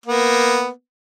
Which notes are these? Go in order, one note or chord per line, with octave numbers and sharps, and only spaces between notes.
A#3 B3